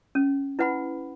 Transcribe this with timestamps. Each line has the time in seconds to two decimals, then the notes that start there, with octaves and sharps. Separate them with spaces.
0.15 C#4
0.59 E4 B4 F#5 B5